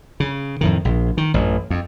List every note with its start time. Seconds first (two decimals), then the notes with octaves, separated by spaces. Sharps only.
0.20 C#3
0.61 F2 A2 D#3
0.85 A#1
1.17 D#3
1.34 A1 F#2
1.70 F2